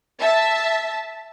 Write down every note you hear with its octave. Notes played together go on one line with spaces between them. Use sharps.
E5 A5